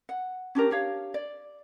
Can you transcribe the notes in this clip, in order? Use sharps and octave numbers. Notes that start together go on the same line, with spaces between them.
F#5
C#4 D4 G4 A#4
D4 G4 C#5 F5
D5